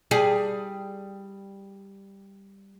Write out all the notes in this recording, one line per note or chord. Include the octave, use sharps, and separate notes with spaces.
G3 G#4